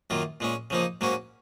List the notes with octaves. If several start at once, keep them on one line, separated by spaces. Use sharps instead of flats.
F#2 D#3 A#3 F4
A#2 G#3 C#4
C#3 F3 A#3 D#4
G#2 F#3 A#3 C#4 F#4